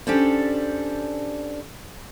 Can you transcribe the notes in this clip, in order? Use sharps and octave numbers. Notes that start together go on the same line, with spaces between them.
C#4 D4 G4 A4 C5 D5